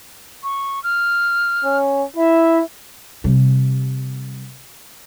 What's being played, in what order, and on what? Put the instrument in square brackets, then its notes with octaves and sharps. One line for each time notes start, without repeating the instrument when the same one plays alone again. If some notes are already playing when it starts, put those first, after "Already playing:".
[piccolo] C#6
F6
[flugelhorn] C#4
[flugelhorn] E4 [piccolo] E5
[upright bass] C3 G3